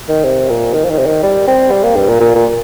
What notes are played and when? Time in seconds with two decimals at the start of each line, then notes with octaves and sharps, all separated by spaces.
0.09 D#3
0.25 C3
0.50 A#2
0.74 D#3
0.84 F3
0.90 D#3
0.99 C3
1.06 D#3
1.23 G3
1.48 C4
1.72 G3
1.83 A#3
1.96 G2
2.08 A#2
2.21 A#2
2.35 A#2